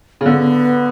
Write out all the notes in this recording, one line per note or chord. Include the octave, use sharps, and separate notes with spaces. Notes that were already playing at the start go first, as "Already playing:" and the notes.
C#3
D3 B3